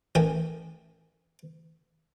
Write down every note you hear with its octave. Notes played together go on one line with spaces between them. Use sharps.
A1 E3 A4 A#4 G5 G#5